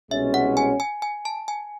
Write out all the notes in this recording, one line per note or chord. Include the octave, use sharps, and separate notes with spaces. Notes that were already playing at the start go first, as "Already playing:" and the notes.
C2 B2 G#3 C#4 E5
F#5
G#5
G#5
G#5
A5
G#5